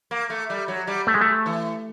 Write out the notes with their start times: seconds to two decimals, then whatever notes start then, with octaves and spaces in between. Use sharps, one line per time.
0.11 A#3
0.30 A3
0.50 G3
0.68 F#3
0.87 G3
1.07 A3
1.14 G#3
1.21 A3
1.46 E3